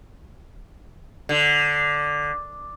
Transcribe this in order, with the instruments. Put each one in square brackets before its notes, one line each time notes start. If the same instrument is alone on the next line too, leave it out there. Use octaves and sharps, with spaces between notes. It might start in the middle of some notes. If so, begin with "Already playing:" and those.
[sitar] D3